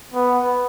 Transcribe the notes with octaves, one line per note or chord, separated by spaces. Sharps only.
B3